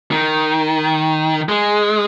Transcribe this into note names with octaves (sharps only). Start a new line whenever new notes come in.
D#3
G#3